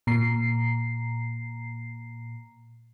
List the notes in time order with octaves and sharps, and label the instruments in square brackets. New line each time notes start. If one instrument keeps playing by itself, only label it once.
[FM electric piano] A#2 A#5 C7